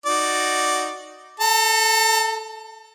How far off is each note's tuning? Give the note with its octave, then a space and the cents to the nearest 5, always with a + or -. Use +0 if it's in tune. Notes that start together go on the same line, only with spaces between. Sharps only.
D#4 +0 F#4 +0 D5 +0
A4 -5 A5 +45